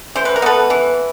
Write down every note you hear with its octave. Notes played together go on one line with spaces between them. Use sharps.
E3 C5
B4
A#4
B3 A4 B4
E3